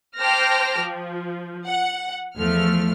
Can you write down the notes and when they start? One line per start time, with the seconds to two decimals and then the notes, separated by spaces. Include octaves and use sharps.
0.18 C5 G5 A5 D6 F6 A#6
0.81 F3
1.67 F#5
2.37 E2 F3 A3 F6